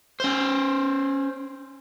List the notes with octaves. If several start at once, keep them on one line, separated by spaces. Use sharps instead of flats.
C#4 C5